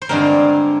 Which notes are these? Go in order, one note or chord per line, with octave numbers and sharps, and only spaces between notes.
C5
G2 D3 G#3 C4 A#4